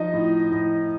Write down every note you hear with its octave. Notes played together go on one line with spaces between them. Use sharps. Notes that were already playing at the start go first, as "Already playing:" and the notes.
Already playing: F3 D#4 D#5
A2
A2